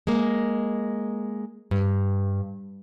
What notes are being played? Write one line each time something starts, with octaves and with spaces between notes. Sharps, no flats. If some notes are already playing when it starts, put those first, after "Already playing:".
G#3 A#3
G2